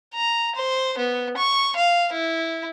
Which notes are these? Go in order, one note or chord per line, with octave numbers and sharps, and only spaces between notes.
A#5
C5
B3
C#6
F5
E4